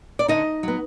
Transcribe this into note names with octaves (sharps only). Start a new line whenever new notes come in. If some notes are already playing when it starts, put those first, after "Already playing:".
D5
D3 D#4 D#5
F#3 B3